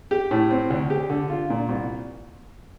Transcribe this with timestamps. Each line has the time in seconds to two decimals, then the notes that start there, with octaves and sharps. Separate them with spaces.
0.11 G4
0.31 A2
0.51 C4
0.70 D2
0.90 G4
1.10 D3
1.30 F4
1.50 A#2
1.69 C2